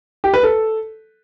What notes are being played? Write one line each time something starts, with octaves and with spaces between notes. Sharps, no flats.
G4
B4
A4